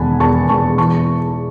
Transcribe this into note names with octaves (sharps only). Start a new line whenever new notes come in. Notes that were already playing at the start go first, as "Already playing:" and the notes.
Already playing: E1 D#3 F#5 G#5 A5 B5
E2 A5 C#6
E1 A5 C#6
E3 A5 C#6